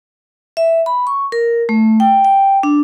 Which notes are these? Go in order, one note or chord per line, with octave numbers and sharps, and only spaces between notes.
E5
B5
C#6
A#4
A3
G5
G5
D4